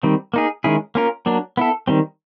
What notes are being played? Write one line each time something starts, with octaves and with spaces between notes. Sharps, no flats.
D#3 G3 C4
A#3 D#4 G#4
D#3 G#3 C#4 E4 G#4
A#3 C#4 F4 A#4
F#3 A#3 D4
B3 E4 A4
D#3 G3 C4